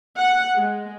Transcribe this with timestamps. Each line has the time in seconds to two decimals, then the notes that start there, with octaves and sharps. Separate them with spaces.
0.18 F#5
0.59 G#3